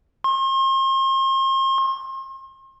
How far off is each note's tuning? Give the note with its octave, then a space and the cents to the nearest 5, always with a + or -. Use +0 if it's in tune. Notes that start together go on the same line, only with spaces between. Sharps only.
C6 +40